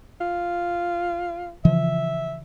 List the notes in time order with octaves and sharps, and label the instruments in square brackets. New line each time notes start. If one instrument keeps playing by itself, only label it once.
[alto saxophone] F4
[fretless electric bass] C#3 E3 F3 [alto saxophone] E5